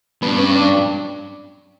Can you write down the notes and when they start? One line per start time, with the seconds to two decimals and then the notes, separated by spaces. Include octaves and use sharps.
0.23 G2 B3
0.38 C#4
0.56 D4